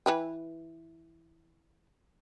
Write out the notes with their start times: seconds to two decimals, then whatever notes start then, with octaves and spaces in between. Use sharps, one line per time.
0.06 E3 B4 G5